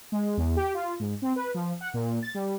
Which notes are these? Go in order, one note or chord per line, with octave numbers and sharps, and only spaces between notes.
G#3
E2
G4
F4
G#2
C4
B4
F3
F#5
A#2
A6
G3